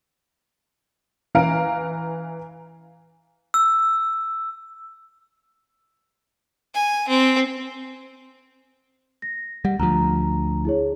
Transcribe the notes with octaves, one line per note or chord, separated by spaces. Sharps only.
E3 F5 A#5 D7
E6
G#5
C4
A#6
G3 F#5
D2 F3 A#5
E4 G#4 C#5